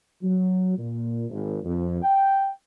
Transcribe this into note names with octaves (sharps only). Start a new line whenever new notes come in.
F#3
A#2
G#1
F2
G5